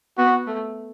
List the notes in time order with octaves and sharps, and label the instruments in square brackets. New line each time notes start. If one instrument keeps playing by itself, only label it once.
[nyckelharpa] B3 [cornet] F#4
[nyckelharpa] A3